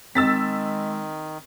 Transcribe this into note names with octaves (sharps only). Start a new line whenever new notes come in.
D#3 G#3 C4 E6 A6 B6